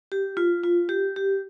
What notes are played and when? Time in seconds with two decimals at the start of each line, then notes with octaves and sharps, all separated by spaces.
0.12 G4
0.37 F4
0.64 F4
0.89 G4
1.16 G4